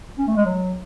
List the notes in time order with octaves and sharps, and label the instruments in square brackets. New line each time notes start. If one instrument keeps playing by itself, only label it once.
[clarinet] C#4
A3
G#3
F#3